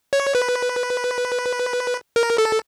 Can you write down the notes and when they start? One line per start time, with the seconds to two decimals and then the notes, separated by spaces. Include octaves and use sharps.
0.13 C#5
0.35 B4
2.16 A#4
2.38 A4